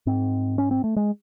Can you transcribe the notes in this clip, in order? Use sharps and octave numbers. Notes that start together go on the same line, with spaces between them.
G#2 C4
C#4
C4
A3
G#3